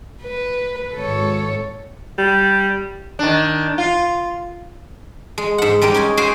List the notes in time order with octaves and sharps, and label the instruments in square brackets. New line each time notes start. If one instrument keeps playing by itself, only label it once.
[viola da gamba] B4
[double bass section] G#1 [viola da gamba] A4 C#5
[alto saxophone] G3
[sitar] D#3 D4
F4
[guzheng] G#3
G#2 F#5
G3 G#3 G4 A#4
C#4 D#4 G#5
F#4 G#4 C5 F5 G5 G#5